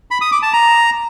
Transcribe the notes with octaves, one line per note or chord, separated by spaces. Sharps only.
B5
D#6
D6
A5
A#5